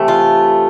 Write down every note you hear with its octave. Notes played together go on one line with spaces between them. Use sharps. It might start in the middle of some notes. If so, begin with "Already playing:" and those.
Already playing: C3 E3 A3
F4